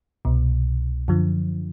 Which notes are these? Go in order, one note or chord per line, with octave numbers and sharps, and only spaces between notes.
C2 B2
F#2 D3 F3